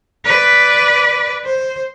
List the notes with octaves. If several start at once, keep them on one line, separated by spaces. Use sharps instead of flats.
B4 D5
C5